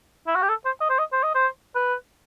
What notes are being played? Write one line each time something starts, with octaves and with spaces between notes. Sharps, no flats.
E4
F#4
G4
A4
C5
D#5
C5
D#5
C5
D#5
C5
B4